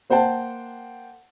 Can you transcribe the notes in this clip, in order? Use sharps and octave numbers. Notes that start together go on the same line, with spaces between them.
A#3 C5 F#5 G5 A5